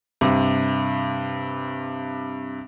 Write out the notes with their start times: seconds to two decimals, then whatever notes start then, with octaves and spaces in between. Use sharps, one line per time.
0.21 G2 C3